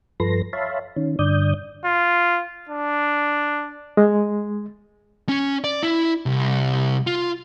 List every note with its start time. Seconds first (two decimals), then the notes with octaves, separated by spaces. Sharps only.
0.20 G2 F3 A4 B4 C6 A#6
0.53 C#5 E5 F5 A5 B5 C6
0.96 D#3 C#4
1.19 G2 D3 D5 D#6 G6
1.85 F4
2.69 D4
3.97 G#3
5.29 C#4
5.64 D5
5.83 E4
6.26 C2
7.07 F4